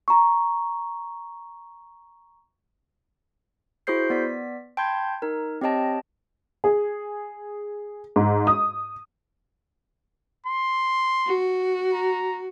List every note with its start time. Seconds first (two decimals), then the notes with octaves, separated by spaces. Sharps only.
0.08 A#5 C#6
3.87 E4 F#4 G#4 C5 G6 C7
4.10 B3 D5 B6
4.77 G5 A5 B5 C6 G6 G#6
5.22 D#4 A#4
5.61 C4 G4 C#5 D#5 G5 A5
6.64 G#4
8.16 G#2
8.47 D#6
10.47 C6
11.27 F#4
11.93 A#5